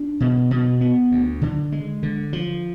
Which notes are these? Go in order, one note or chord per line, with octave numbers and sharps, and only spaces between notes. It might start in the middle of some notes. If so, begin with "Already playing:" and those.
Already playing: D4
B2
B2
B3
D2
D3
G#3
D3
F3